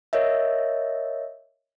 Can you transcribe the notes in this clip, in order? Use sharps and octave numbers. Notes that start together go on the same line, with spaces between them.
A#4 C#5 D#5 E5